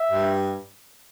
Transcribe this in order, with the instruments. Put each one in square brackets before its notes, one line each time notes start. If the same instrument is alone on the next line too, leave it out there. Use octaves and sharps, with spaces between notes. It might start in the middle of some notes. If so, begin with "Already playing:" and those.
Already playing: [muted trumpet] E5
[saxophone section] G2